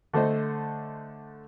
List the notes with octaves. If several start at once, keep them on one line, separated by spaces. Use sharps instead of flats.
D3 A3 A4 C5 D#5